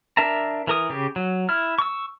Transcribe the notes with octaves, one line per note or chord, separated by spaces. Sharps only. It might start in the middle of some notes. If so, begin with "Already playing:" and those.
D4 A#4 E5 A5 A#5
E3 A#4 D#6
C#3 G4
F#3
E4 F6
C#6 E6